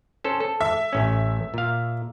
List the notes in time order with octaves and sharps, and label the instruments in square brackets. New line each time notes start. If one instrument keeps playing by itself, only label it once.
[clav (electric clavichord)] C#4 A4 C5
A4
[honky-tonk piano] E5
[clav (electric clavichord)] A1 C#4
A#2 F5